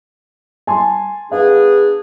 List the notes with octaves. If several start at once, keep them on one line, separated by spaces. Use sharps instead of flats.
G#5 A5 C6
B3 D4 G#4 F5